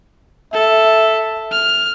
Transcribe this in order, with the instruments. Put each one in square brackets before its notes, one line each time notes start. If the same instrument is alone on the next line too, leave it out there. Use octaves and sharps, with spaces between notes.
[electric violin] A4 [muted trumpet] E5
[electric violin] F6